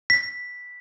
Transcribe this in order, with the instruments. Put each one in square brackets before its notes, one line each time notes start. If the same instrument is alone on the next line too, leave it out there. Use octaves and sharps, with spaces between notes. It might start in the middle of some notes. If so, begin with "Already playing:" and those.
[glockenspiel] B6